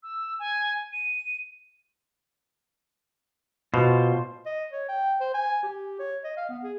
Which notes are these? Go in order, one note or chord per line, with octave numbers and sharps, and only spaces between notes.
E6
G#5
D#7
B2 F4 C5
D#5
C#5
G5
C5
G#5
G4
C#5
D#5
F5
B3
G#4